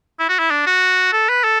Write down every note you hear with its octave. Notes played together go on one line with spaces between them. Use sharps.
E4
F#4
E4
D4
F#4
A4
B4
A4